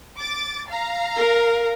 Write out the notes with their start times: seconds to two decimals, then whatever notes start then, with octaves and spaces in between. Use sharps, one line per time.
0.19 D6 A6
0.69 F5 A#5
1.16 A#4